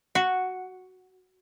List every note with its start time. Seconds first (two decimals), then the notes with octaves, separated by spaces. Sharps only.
0.15 F#4